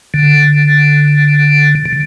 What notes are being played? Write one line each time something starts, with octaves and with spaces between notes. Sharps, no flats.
D3
D3